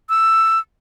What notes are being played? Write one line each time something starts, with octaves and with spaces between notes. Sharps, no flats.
E6